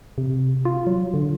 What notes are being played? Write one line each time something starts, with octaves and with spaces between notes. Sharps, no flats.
C3
F4
F#3
D3